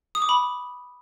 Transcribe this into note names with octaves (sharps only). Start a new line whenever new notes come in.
D#6
D6
B5